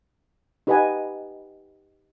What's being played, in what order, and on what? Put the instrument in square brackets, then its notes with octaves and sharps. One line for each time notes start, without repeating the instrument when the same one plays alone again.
[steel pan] D#4 G4 B4 D#5 F#5 G#5